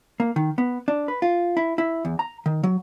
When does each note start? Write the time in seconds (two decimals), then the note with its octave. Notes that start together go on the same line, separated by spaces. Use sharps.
0.20 A#3
0.36 D#3
0.58 B3
0.88 D4
1.08 B4
1.22 F4
1.57 E4
1.78 E4
2.05 E2
2.19 A#5
2.46 D#3
2.64 F#3